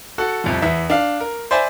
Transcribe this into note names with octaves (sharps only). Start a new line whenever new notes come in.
F#4 A4 F#5
C2 F2 F3
E2 E3 E5
D4 F5
A#4
C5 D5 E5 G#5 B5